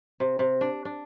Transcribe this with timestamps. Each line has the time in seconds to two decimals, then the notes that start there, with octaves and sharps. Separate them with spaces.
0.20 C3
0.39 C3
0.61 D4
0.85 D4